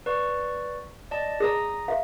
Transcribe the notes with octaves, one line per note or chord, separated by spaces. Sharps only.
B4 D5 C#6
D5 D#5 A5
G#4 D5 A#5 D#6 A#6
E5 F5